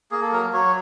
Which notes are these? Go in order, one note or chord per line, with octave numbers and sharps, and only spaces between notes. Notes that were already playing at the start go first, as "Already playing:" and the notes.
A#3 G#4
A4
F#3 A#4
F#3 C#5